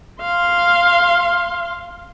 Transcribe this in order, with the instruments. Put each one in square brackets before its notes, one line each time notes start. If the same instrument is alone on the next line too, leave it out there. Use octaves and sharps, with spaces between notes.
[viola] F5 C6